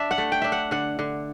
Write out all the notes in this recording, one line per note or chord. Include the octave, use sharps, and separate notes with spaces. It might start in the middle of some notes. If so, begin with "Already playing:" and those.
Already playing: D4 D5 E5
F#5
A3
G5
D4 E5
F#5
D3 F#5
D3